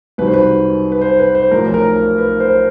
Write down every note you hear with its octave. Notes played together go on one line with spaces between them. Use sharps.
C2 C3 D#3 F#3 B4
C5
B4
B4
C5
B4
C5
B1 A2 F3 A#4
A#4
B4
C5